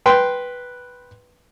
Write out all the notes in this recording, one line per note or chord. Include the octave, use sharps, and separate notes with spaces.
B4 G5 C6